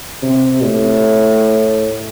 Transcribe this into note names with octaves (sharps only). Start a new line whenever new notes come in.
C3
A2